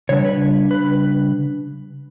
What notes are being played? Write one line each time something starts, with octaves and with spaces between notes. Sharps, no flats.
C#3 G3 D4 C#5
B4
B4